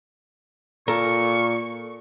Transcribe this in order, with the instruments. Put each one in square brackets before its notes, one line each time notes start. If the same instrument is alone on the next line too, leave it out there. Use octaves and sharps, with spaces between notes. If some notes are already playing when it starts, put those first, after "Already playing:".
[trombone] A#2 [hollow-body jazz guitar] A4 A#4 [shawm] C#6